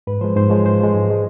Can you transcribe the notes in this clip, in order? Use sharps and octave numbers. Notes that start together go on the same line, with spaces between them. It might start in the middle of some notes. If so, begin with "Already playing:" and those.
G#2 B4
F3 G#3 C5
G#2 C5
F3 G#3 C#5
G#2 C5
F3 G#3
G#2
F3 G#3